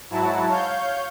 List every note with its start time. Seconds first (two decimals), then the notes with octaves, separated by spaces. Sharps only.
0.10 G#2 F#3 E4 F#4 A5
0.49 C#5 F5 G6